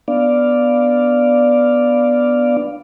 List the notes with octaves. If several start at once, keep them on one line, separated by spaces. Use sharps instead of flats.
B3 D4 D5 F5